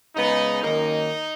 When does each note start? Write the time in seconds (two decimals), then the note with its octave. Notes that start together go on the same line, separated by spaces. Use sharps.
0.15 C#3 G#3 B3 D#4
0.62 F#2 D#3 A#3 D#4